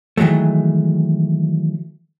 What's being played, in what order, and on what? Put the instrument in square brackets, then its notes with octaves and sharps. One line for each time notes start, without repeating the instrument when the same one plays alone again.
[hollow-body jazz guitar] D#3 E3 F#3 G#3 A3